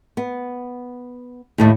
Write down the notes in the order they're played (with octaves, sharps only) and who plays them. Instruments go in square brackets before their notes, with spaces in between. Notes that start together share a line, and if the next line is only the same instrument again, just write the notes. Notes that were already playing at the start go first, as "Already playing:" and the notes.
[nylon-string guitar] B3
D#2 A2 A3